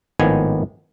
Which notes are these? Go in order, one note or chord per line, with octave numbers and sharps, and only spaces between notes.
G#1 A2 D#3 F3 B3 G#5